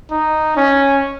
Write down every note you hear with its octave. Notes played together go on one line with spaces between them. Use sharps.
D#4
C#4